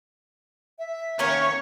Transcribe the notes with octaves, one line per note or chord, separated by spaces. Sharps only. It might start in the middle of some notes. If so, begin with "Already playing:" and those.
E5
D#3 A#3 C#4 C#5